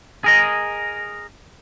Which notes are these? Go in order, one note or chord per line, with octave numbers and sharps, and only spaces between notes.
G#4 A#4 D#5